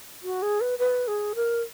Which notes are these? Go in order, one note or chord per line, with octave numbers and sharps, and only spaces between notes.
F#4
G#4
B4
B4
G#4
A#4